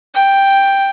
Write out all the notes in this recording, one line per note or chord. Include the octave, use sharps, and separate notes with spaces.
G5